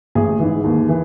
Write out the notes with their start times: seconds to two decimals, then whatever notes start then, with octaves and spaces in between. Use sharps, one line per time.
0.15 A1 G#4
0.39 G#2 E3
0.64 D#2
0.89 E3